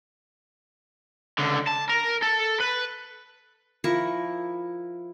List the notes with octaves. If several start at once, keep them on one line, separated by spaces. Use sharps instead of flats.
C#2 D3
A5
A#4
A4
B4
F3 E4 A#4 C#6